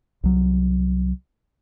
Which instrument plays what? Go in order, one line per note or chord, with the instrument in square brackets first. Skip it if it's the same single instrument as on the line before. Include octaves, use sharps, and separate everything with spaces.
[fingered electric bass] C2 F#3